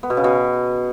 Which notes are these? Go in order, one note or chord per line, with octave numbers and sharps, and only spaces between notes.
B3
B2
C#3
B2